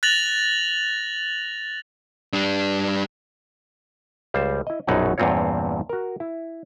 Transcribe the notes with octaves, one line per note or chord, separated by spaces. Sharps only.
F#6 A6 A#6 F7 F#7
G3 D4
C#2 G3 C5
E4 D#5
A#1 F#2 B2 F#3 D#4 F#5
E2 G2 A#2 C4 F4 C#5
F#4 A#4
E4